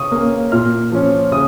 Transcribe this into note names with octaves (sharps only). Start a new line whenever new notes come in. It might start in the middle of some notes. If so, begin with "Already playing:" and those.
Already playing: C#3 C#6 D#6
A#3 C#4
A#2 F6
F3 C#4
C#3 D#6